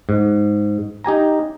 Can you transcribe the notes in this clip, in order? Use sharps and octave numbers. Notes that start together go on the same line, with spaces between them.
G#2
D#4 G4 G#5 A#5